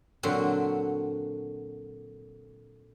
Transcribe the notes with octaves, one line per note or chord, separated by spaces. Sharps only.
A#2 D3 F#3 C4 F#4